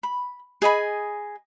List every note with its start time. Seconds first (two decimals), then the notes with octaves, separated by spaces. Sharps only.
0.03 B5
0.62 G#4 D#5 G#5 B5